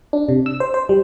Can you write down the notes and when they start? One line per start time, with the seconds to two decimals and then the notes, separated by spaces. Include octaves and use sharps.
0.13 D4
0.29 C3
0.46 E6
0.60 C5
0.74 C5
0.89 G3